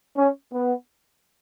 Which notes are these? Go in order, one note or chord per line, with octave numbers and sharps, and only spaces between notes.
C#4
B3